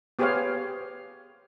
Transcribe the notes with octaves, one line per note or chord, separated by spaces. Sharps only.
B3 G4 G#4 C5 C#5 F5